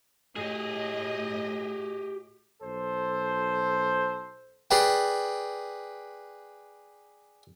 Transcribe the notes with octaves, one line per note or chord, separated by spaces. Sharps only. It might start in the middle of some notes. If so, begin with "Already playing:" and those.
A2 G4 G#4 D#5
B1 A4 C5
G#4 B4 D5 G5